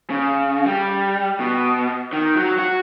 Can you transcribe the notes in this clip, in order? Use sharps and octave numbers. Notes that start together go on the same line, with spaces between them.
C#3
G3
B2
D#3
F#3
F#4